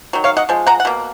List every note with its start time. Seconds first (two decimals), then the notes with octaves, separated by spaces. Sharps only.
0.13 D#3 F#3
0.24 C#5 F5
0.37 D#5 F#5
0.49 F3 G#3
0.67 F#5 A#5
0.80 F#5
0.85 B2 A#3